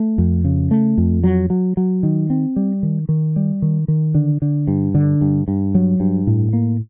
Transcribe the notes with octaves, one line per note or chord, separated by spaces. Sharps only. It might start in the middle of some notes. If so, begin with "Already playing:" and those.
Already playing: A3
F2
C#3
A3
F2
F#3
F#3
F#3
D#3
C4
G3
D#3
D#3
G3
D#3
D#3
D3
D3
G2
D3
G2
G2
F#3
G2
A2
A#3